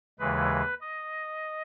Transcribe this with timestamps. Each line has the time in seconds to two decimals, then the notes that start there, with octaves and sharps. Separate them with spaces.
0.19 D#2 C#3 E3 G#3 B4
0.81 D#5